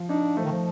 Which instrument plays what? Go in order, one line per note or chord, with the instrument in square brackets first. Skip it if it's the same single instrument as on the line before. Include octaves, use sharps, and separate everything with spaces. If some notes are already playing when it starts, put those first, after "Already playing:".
Already playing: [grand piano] F3
[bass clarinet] D4 [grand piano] D#4
[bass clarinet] F3 [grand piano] A3
[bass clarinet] D#3
F3